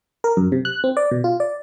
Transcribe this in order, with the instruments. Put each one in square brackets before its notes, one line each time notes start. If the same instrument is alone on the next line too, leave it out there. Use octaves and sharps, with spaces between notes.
[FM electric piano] A#4
F#2
C3
F#6
C4
D5
B2
F4
D5